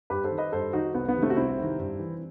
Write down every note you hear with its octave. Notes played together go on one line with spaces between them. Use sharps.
G2 G4 B4
A4 C5
D#3
B4 D#5
G2 A4 C5
D#3 D#4 F#4
C2 B3
B3
C3 D#3
A3 C4
F#4
C2 C4 E4
C3 D#3
G2
E3